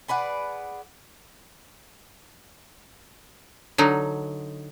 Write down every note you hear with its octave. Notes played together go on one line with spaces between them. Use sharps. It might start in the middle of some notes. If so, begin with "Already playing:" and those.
G#4 B4 D5 F#5
D3 F#3 D#4